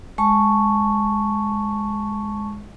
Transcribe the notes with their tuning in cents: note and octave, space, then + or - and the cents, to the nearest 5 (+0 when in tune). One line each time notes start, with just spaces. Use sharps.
G#3 +0 A5 +0 C#6 +0